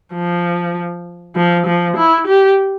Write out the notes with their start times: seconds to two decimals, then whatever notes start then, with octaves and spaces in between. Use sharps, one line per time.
0.13 F3
1.36 F3
1.66 F3
1.97 E4
2.27 G4